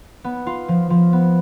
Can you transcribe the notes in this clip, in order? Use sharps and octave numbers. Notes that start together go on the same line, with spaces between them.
B3
F4
F3
F3
B3